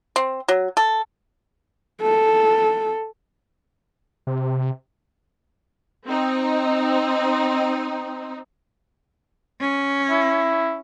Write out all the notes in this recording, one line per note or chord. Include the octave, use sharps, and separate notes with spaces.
C4
F#3
A4
A4
C3
C4 D#4
C#4
E4